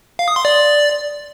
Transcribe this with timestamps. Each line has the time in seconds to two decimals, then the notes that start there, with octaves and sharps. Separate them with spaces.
0.19 F5
0.28 D#6
0.36 C6
0.45 D5